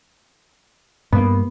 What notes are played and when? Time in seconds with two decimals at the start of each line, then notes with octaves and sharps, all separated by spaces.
1.13 G2 A#3 B3